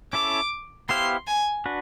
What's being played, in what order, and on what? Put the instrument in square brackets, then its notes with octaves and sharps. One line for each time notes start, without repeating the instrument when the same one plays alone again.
[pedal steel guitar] C#4 E4 A4 C#5 [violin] D6
[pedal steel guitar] B3 E4 G4 C5 F5 [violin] C6
[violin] G#5
[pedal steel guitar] D4 F#4 B4